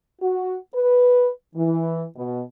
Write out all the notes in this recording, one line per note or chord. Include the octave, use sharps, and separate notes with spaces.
F#4
B4
E3
B2